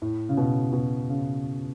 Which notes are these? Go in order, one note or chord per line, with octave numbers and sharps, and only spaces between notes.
A2
C#3
B2
B2
C#3